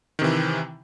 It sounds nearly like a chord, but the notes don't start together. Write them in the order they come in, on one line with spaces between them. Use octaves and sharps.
D#3 C3 E3